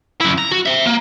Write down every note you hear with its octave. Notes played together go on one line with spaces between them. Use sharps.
F#2 E4
A#5
F#4
C5 E5
A#3